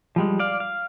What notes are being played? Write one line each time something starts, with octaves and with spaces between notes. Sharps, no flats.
F3 G3 G#3
D5 F5
F5